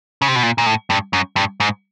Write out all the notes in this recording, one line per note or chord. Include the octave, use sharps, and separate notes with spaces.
C#3
C3
B2
A#2
A#2
A2
G2
F#2
G2
G#2